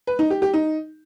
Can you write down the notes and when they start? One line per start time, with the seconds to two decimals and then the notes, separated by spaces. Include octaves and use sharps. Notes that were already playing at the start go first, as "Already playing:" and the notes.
0.07 B4
0.19 D#4
0.30 G4
0.42 G4
0.54 D#4